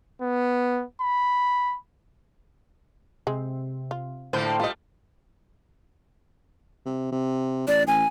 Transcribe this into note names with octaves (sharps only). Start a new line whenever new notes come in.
B3
B5
C3 G#3
F4
A2 D3 F3 A#3 C5 G5
G3 A3 F4 D#5
C3
C3
A1 D5
A1 G#5